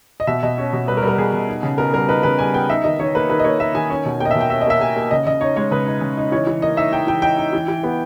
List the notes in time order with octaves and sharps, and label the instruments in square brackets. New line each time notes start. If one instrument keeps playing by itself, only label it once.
[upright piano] D#5
B2 E5
B2 D#5
C#4
B2
G3 B4
A#4
G3
A#4
B2 G#4
B2
D#4
C#3
B3 A#4
G3 A#4
D#4 B4
C#3 B4
G3 G#5
B3 G5
D#4 E5
D#3 D#5
D#3 C#5
A#3 B4
D#3 B4
D#5
A#3 C#5
A#3 E5
D#3 G#5
C#4
B2
A#3 G5
D#5
E5
B2
G5
C#4 E5
D#5
A#3 E5
A#3 G#5
A#3
C#3 D#5
C#3 D#5
D#4 C#5
G#3 C#5
C#3 B4
D#4
C#3
D#4
E3 C#5
E3
A#3 D#5
D#4 E5
D#4 G5
E3 G5
D#4 G5
D#4
E3
E3
B3